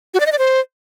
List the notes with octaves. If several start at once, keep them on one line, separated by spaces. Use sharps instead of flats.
F#4
D5
D#5
D5
C5